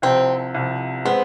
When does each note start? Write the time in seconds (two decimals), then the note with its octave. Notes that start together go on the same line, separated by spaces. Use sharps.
0.02 C2 C3 F3 C4
0.54 C2 C3 F3
1.05 G#3 B3 C4